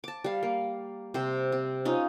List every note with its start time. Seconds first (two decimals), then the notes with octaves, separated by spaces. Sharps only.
0.04 A5 D6
0.24 G3 F5
0.43 A#3
1.14 C3 C4 C5
1.52 C4
1.85 C#4 D#4 F4